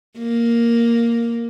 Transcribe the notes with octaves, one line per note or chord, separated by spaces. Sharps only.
A#3